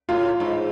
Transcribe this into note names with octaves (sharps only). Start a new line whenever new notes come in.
A2 F4
G#2